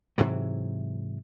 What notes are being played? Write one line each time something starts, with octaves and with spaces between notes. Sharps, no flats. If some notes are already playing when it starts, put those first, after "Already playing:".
G#2 C3 E3 F#3